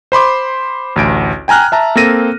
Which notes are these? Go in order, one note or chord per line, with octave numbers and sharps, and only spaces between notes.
C5 B5 C6 D6
A1 D2 D7
G5 G#5 A#5 F6 F#6
E5 A5 A#5
A#3 C4 A4 A#6 D#7